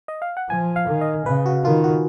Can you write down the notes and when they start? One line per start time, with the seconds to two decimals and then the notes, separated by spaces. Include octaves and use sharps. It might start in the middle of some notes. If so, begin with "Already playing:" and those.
0.08 D#5
0.22 F5
0.37 F#5
0.49 F3 G#5
0.76 F5
0.87 D#3
1.01 D#5
1.26 C#3 B4
1.46 F#4
1.64 D#3 F4
1.84 F#4